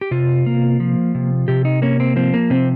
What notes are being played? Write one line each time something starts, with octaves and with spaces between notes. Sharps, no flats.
G4
C3 F4
A#3
F3
C3
C3 G4
D#4
A#3 C#4
C4
F3 C4
A#3
C3 C4